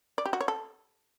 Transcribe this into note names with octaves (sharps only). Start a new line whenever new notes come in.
D5
G4
F#4
C#5
A4